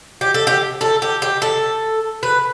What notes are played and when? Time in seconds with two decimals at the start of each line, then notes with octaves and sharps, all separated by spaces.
0.21 G4
0.34 A4
0.47 G4
0.81 A4
1.02 G4
1.22 G4
1.42 A4
2.23 B4